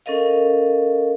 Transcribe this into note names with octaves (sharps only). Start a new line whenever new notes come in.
C#4 A4 A#4 D#5 F5